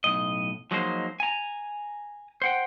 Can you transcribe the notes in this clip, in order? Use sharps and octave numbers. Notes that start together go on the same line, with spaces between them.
B1 A2 D#5
F3 F#3 G#3 A#3 D#4 C5
G#5 A#5
C5 F#5 G5